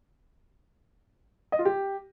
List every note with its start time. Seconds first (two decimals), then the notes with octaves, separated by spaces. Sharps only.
1.52 D#5
1.59 F4
1.65 G4